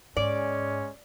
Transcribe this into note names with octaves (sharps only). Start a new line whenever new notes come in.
G#2 G#3 C#4 D5